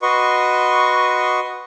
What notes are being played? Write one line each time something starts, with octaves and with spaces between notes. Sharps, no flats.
F#4 B4 D#5 C6 C#6